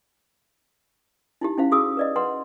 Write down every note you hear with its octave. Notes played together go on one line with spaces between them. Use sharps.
D#4 E4 G4
C#4 E4 C5 F5
F#4 G#4 D#6 E6
B4 D5 D#5
B4 D#5 F#5 C6